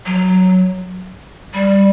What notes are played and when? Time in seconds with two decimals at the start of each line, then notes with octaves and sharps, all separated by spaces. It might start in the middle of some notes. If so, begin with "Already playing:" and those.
0.06 F#3
1.54 G3